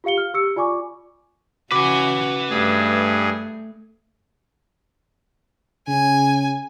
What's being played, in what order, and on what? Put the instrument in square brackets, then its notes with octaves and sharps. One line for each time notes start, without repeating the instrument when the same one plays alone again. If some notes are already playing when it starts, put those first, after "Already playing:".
[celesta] F4 G4 F5 C#7 G7
F6
G4 E6 C#7
F4 D5 G#5 C#6 D6
[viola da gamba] C#3 F#4 [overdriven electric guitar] B4 G#5 [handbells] D6
[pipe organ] G2 G#4 [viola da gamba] A3
[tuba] C#3 [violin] G#5